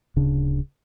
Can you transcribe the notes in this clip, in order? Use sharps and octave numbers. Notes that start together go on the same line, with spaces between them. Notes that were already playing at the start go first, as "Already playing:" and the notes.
D1 C#3 D4